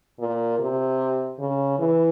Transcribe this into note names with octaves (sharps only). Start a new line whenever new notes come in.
A#2
C3
C#3
E3